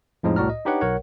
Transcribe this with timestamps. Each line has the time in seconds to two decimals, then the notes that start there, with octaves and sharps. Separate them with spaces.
0.23 F2 A2 F3 G#3 D#4
0.36 C2 A2 F#4 D5 A#5 F6
0.50 D#5
0.65 D4 D#4 G4 B4 C#5 F#5
0.81 B1 A#4 C#5 F#5